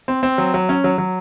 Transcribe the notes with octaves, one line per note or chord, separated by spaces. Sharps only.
C4
C4
F#3
F#3
C#4
F#3
F#3